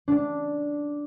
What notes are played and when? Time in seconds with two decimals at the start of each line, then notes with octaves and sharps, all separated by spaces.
0.08 D4